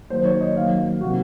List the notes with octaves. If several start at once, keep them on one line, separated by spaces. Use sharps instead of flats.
D#3 F#3 A#3 C5
C#5
D#5
D#3 F#3 A#3 F5
C3 D#3 F#3 A#3 F#4